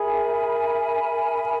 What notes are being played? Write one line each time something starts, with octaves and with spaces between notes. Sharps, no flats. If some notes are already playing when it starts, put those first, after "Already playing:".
Already playing: G#4 A#4 E5 G#5 B5